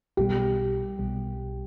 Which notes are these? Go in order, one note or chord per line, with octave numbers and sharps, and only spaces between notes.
B1 B2 G3 G4
B1 B2 G3